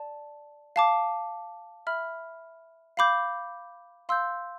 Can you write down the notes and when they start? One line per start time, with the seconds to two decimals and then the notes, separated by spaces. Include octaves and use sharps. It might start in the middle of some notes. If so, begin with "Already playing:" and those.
Already playing: D5 A5
0.76 F5 A5 D6
1.87 E5 B5 F6
2.97 F5 B5 D6 G6
4.09 F5 C6 E6 G6